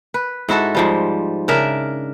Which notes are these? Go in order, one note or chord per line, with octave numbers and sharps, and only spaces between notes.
B4
G#2 E4 F#4 A4
G#2 F3 G3
C#3 D4 A#4 E5